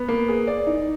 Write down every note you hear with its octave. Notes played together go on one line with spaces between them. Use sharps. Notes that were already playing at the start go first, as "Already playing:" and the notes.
Already playing: B3
A#3
G#4
D5
D#4